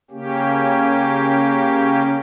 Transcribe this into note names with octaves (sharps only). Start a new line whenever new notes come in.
C#3 A#3 C#4 G4